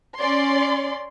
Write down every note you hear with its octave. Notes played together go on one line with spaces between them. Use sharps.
C#4 D5 C6